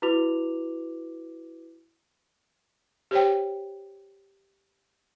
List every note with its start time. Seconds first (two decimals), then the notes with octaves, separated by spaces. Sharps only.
0.02 E4 F#4 B4 D6 F7
3.11 G4 C5 C#5 G5